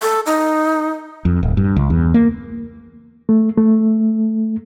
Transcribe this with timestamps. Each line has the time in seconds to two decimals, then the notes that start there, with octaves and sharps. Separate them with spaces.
0.02 A4
0.26 D#4
1.25 F2
1.43 D1
1.57 G2
1.76 C#2
1.90 E2
2.14 A#3
3.29 A3
3.57 A3